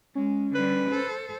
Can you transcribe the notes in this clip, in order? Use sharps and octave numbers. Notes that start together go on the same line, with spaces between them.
G#3 C#4
D3 G3 B4
A4 C5